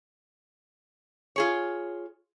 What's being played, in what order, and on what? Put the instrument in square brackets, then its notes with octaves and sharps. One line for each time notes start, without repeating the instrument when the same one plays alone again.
[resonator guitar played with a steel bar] F4 G#4 C#5